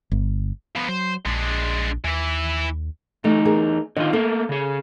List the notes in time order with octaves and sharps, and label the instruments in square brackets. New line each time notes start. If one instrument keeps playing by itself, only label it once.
[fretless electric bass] G1
[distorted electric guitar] F3 B3
[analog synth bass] F#3 [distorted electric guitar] C5
[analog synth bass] A#1 [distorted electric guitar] G#3 D4
[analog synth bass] D#2 [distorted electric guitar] E3 E4
[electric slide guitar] E2 D#4 [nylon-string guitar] A3
[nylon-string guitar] G#4 A#4
[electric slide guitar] D3 D#3 F4 [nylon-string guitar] D#5
[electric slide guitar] A3 A#3 [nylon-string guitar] A4
[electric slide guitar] C#3 G#4